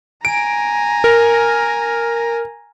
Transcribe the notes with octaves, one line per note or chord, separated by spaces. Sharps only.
G#5 A#5 D7
A#4